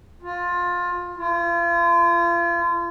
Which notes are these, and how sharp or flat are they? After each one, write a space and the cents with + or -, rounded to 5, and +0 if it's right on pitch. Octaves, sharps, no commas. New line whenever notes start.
F4 +20
F4 -35